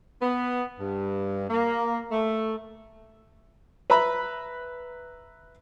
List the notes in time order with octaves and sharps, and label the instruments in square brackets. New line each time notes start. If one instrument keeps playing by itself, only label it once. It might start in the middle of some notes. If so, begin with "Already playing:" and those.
[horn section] B3
G2
A#3
A3
[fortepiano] B4 E5 A#5 B5